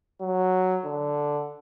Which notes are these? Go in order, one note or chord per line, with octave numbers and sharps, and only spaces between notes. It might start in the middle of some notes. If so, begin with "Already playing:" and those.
F#3
D3